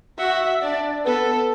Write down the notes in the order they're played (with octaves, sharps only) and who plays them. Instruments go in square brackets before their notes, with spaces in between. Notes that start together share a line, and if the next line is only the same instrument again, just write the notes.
[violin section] F#4 F#5 [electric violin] E5
[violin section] D4 D5
[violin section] B3 B4 [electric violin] A4